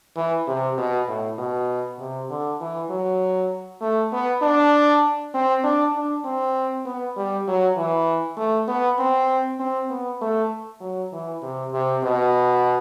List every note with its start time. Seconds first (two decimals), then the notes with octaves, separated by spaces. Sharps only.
0.16 E3
0.47 C3
0.78 B2
1.08 A2
1.38 B2
1.99 C3
2.30 D3
2.61 E3
2.90 F#3
3.81 A3
4.13 B3
4.42 D4
5.34 C4
5.64 D4
5.95 D4
6.25 C4
6.85 B3
7.16 G3
7.48 F#3
7.77 E3
8.38 A3
8.68 B3
8.99 C4
9.60 C4
9.90 B3
10.21 A3
10.81 F#3
11.12 E3
11.42 C3
11.73 C3
12.03 B2